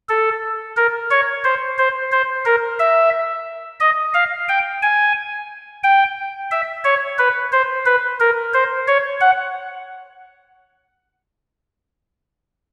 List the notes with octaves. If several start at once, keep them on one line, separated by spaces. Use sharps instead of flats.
A4
A#4
C#5
C5
C5
C5
A#4
E5
D#5
F5
G5
G#5
G5
E5
C#5
B4
C5
B4
A#4
C5
C#5
F#5